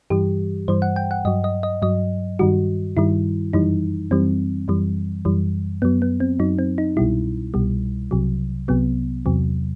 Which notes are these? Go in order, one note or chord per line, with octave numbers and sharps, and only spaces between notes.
G2 E3 G3 G4
G2 E3 G3 C5
F#5
G5
F#5
G2 F#3 D#5
D#5
D#5
G2 F#3 D#5
G2 D#3 G3 F#4
G2 D#3 G3 E4
F#2 E3 G3 D#4
F#2 E3 G3 C4
F#2 E3 G3
F#2 E3 G3
F#2 F#3 B3
B3
C4
F#2 F#3 D#4
C4
D#4
C2 B2 G3 E4
C2 B2 G3
C2 C3 F#3
C2 C3 F#3 B3
E2 C3 F#3